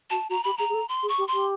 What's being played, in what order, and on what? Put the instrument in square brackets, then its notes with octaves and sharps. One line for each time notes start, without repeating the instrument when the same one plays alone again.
[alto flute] F#4 [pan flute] A5
[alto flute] F#4 [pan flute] A#5
[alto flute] G4 [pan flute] B5
[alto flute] G#4 [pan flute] A#5
[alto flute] G#4
A4
[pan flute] C6
[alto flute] G#4
[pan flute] C#6
[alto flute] G4
[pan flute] C6
[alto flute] G4